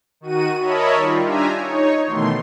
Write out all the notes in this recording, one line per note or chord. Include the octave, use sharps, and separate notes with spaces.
D#3 F#4 D#7
A#4 C#5 D#5 E5 A5 B5
D#3 G3 F4
D4 F4 G4 E5 G#5 A#5
D#4 C#5
B2 D#3 E3 A3 C6